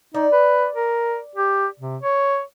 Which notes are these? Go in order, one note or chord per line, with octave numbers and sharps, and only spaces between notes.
D#4 D5
B4
A#4
G4
C3
C#5